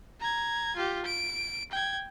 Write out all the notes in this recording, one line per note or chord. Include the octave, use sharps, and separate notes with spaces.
A#5 G#6
F4 G4
D7
G5 G#6